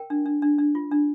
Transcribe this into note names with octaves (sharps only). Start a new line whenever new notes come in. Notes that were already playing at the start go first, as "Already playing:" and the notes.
Already playing: A#4 G5
D4
D4
D4
D4
F4
D4